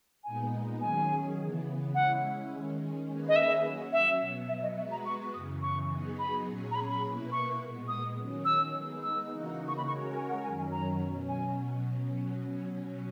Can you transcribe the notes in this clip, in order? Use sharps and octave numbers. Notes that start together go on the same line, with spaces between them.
A#2 G#3 B3 D#4 G#5
D#3 F#3 C#4 G#4 G#5
C#3 E3 B3
G#3 C#4 E4 F#5
D#3 G#3 C#4
D#3 A#3 C#4 G#4 B4
D#5
E5
F#3 C#4 F#4
E5
B2 F#3 B3
E5
D#5
G#3 B3 F#4 B4 E5
A#5
C#6
F#2 C#3 E3 D#6
C#6
F#3 B3 D#4 G#4
B5
A#2 F#3 C#4 G#4 C#5
A#5
B5
B5
B2 A#3 E4 B4
C#6
A#2 G#3 B3
D#6
D#3 F#3 C#4
E6
G#3 B3 D#4
E6
C#3 E3 A#3 D#4 F#4
C#6
B5
G#3 C#4 F#4 A#4 C#5 C#6
G#5
F#5
F#2 D#3 F#3 C#4 G#5
G#5
A#5
B2 F#3 C#4
G#5